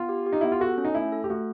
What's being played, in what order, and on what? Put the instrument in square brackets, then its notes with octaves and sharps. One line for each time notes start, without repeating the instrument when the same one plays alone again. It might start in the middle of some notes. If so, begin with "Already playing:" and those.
Already playing: [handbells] B3 [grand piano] F4
[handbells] G4
G4
[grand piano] D#4
[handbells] B3 [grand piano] E4
[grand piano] F4
[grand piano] F#4 [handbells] A4
[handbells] C#4
[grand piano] D#4
[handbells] A3 [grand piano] E4
[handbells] A4
[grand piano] G4
[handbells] A3 [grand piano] F#4